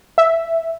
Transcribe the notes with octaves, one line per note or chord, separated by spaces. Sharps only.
E5